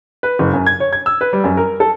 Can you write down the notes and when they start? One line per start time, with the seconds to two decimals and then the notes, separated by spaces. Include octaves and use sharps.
0.23 B4
0.39 F#1
0.53 F#2
0.66 G#6
0.80 C#5
0.93 G#6
1.06 E6
1.21 B4
1.33 G3
1.44 F#2
1.57 A#4
1.80 A4